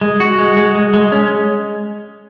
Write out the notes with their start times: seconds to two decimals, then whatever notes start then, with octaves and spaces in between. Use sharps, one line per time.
0.01 G#3
0.20 F#4
0.38 G#3
0.57 G#3
0.75 G#3
0.94 G#3
1.12 C#4